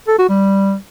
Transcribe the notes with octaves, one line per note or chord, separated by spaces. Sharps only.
A4
F#4
G3